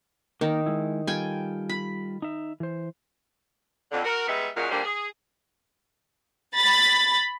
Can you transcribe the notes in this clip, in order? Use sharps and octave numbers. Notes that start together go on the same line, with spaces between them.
D#3 A#3 D#4 A#4
G#3 E4
G3 F4 A4 G5 G#5
B5
D#4 E5
E3 C5
F2 D3
F#4 A#4
G3 G#3 B3 D#4 E5
F#2 A#2 F#3 G#3 F#4 F5
A#2 D3 G3 A#3 D4 C5
G#4
B5 A6